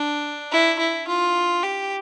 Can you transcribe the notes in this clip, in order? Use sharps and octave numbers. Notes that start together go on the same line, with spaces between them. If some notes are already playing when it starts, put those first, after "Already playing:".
Already playing: D4
E4
E4
F4
G4